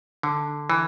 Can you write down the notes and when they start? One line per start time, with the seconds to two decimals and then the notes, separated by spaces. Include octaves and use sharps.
0.23 D3
0.70 E3